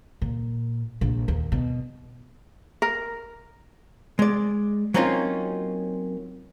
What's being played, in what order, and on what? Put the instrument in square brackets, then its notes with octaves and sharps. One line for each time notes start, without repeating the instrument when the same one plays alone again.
[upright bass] A#2
A#1 A#2
D#2
B2
[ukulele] A#4
[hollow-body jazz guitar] G#3 D5
F#3 A#3 C4 C#4 D#4 F4